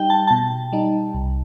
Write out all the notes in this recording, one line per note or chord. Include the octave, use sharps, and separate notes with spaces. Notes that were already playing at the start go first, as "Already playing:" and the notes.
Already playing: G3 D#4 G5
A5
B2 A5
G3 D#4
C2